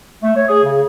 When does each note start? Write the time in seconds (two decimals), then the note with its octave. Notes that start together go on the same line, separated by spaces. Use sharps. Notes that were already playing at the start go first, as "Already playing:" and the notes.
0.22 A3
0.35 C#5
0.47 G#4
0.65 C#3